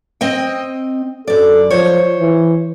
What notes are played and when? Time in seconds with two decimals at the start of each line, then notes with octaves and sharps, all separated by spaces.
0.21 C4 D#5 G5
1.27 F#2 A4 D5
1.70 F3 C5 C#5
2.19 E3